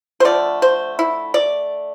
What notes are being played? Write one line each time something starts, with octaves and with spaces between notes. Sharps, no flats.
C5
D3 F3 A3 D5
C5
E4
D5